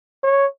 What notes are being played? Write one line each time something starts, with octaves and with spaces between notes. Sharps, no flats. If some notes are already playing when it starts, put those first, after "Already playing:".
C#5